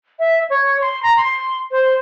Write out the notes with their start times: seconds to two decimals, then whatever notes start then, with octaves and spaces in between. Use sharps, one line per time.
0.19 E5
0.50 C#5
0.81 C6
1.03 A#5
1.17 C6
1.71 C5